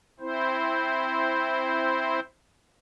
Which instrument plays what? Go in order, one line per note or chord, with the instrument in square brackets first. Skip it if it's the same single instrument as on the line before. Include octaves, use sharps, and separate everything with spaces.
[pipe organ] C4 E4 C5